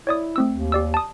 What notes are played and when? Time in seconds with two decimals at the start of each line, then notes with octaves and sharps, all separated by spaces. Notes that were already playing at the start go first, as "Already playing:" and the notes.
0.07 E4 C#5 D5 D#6
0.36 A3 C4 E6
0.52 D#2
0.72 G4 D5 E6
0.94 A5 D#6